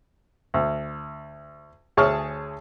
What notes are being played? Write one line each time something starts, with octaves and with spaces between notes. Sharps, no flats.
D2
D2 G#4 C#5 A5 C#6 F6